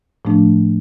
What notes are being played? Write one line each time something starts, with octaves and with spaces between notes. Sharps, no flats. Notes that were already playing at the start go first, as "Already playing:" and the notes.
A2 F3 A3 D4